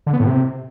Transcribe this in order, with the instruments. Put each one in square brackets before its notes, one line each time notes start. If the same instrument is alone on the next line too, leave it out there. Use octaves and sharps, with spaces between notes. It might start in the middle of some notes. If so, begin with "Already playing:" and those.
[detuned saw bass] D3
B3
A2
C3